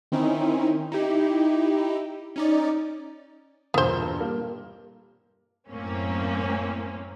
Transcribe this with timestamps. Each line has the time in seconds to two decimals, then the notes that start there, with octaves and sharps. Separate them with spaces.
0.12 D#3 C4 C#4 D#4 E4
0.92 D#4 E4 G4
2.36 C#4 D#4 D5
3.74 E1 G2 A#2 B3 C5
4.21 G3 A#3
5.69 F#2 A2 A#3 C4 C#4